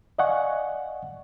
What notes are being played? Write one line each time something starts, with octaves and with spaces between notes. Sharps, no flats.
D5 D#5 F5 F#5 G#5 C#6